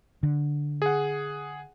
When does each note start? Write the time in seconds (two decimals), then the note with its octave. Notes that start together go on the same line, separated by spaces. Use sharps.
0.23 D3
0.82 G#4 F#5